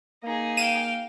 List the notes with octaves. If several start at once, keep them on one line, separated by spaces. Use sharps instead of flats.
A#3 D#4 G#4
F5 G5 D#7 E7